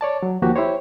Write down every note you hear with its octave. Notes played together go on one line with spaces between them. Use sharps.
C#5 D5 A5
F#3
D#2 F3 A#3 F#4 G4
E4 G4 C5 C#5